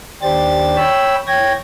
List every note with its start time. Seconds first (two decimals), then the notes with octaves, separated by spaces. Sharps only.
0.22 D#2 D4 G4 C5 A6
0.77 C#5 G5 B5 E6
1.27 E2 C#5 G5 G#6 A#6